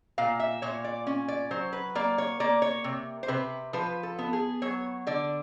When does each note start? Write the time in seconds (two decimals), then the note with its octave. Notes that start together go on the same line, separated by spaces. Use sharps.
0.18 A#2 F5
0.40 E5
0.62 A#2 C#5
0.84 D5
1.07 C#4
1.28 D5
1.51 F#3 C5
1.73 B4
1.95 A#3 D5
2.18 C#5
2.40 A#3 D5
2.62 C#5
2.84 C3
3.23 C5
3.28 C3 B4
3.73 F3 B4
4.03 A4
4.19 B3
4.33 G#4
4.62 F#3 C#5
5.07 D3 D5